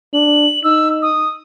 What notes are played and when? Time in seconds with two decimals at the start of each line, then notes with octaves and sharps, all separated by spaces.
0.14 D4 F#7
0.64 D#4 E6
1.02 D#6